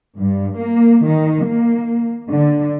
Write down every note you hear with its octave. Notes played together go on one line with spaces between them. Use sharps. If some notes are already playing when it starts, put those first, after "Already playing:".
G2
A#3
D#3
A#3
D3